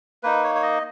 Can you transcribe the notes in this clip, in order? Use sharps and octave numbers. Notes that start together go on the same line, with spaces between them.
A#3 D#4 B4
C#5
C#5
D#5